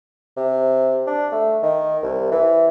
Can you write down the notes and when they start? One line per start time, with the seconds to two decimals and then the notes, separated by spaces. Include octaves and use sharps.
0.37 C3
1.07 D4
1.32 A3
1.62 D#3
2.02 C2
2.31 E3